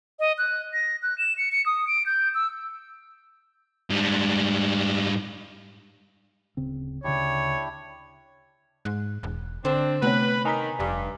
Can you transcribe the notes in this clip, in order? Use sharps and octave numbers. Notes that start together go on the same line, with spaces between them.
D#5
F#6
A#6
F#6
E7
C#7
C#7
D#6
D7
G6
E6
G#2 G3
D1 C#3 C4
D2 C#3 D4 E4 G4 C#5
G#2 F#6
E1
D3 C4 D4
C3 A3 B3 B4 C#5
D#3 G#5 A#5 B6
F1 G2